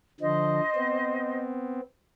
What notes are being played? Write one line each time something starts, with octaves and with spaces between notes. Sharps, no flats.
D3 F3 C5 D#5
B3 C4